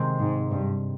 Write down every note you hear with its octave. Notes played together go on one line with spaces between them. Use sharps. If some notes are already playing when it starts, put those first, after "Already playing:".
Already playing: C3 D#3 G#3 C4
G#2
G2